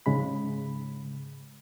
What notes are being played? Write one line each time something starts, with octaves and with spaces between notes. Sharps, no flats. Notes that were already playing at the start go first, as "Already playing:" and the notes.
G#2 C#3 G#3 B5